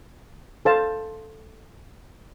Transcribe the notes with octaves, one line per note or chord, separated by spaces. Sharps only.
A4 C5 F5 A5